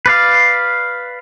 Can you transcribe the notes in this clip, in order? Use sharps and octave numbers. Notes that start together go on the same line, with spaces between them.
B4 D5 F5